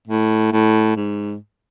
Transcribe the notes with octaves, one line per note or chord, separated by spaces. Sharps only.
A2
A2
G#2